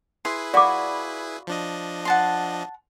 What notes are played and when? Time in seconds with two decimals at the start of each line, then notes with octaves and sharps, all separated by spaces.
0.25 E4 G#4 B4 C6
0.54 F4 F#4 D5 B5 D6
1.47 F3 D4 D#5
2.05 F#5 A5 C6